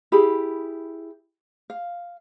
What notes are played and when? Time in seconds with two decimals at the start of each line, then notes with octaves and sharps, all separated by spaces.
0.12 E4 G4 G#4 B5
1.70 F5